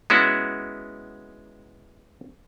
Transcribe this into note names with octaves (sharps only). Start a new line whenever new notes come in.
G#3 B3 C#4 E4 F#4